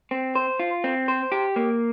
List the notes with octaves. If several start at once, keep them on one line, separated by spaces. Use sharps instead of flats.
C4
C5
F4
C4
C5
G4
A#3